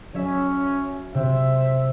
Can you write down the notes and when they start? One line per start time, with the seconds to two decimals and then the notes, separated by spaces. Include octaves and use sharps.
0.14 F#3 C#4 C#5 E5
1.14 C3 C4 C5 E5